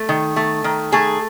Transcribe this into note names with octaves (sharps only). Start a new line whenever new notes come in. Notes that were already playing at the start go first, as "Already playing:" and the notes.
Already playing: A3
D#3
A3
D#3
A3 G#4